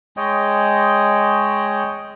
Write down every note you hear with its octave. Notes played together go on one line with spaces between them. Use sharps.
G#3 C#5 D#5 G5